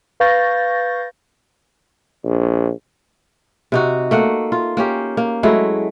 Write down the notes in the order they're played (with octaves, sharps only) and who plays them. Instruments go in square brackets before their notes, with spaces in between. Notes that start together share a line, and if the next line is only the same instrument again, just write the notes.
[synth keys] B4 F5 C#6 G6 A6 A#6
[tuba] A#1
[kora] C3 D#4 F#4
A3 A#3 F#5
F4
A#3 C#4 G4
A#3
F#3 G#3 A3 E4